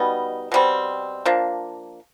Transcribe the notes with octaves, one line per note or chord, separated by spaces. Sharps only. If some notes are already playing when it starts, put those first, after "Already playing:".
Already playing: B2 G3 B3 D#4
B2 G3 C4
F3 A#3 D4